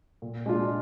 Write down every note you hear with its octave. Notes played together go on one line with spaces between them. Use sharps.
A#2
G#3 D4 F4